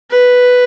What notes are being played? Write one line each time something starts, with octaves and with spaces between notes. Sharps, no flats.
B4